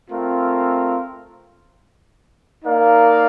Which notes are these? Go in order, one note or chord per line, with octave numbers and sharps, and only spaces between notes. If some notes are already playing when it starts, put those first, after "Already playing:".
A3 C4 F4 A#4 F5
A#3 D#4 A#4 D5 F5